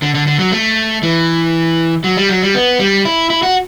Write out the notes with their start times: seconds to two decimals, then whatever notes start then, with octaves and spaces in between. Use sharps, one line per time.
0.02 D3
0.15 D3
0.27 D3
0.39 F#3
0.52 A3
1.03 E3
2.04 F#3
2.17 G3
2.29 F#3
2.42 G3
2.55 B3
2.79 G3
3.05 E4
3.30 E4
3.43 F#4